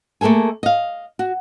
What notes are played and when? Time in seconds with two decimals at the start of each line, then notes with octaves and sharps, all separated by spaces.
0.21 A3 A#3 G#4 A4 G#5
0.63 D#5 F5
1.19 F#4